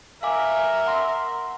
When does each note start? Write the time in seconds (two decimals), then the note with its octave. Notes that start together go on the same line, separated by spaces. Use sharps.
0.23 A#4 E5 F5 G#5 D6
0.86 F#5 C6